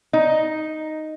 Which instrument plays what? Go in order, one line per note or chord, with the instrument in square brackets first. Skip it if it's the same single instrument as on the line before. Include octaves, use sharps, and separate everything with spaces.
[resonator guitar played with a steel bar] D#4